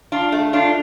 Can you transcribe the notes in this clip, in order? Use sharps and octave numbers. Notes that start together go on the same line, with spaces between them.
D4 F4
A3
D4 F4